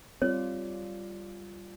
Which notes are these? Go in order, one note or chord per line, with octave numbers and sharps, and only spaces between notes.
G3 C4 F4 C#5 D5